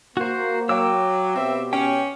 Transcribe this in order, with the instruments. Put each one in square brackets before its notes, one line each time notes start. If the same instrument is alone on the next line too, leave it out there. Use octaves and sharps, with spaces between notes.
[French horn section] A#3 [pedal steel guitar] F#4 C5 [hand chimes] F#6
[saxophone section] F#3 [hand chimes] C#5 F5 D6 [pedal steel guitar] G5 E6
[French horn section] B2 G4 B4 [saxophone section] C4 E5
[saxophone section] C#4 [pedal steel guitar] G5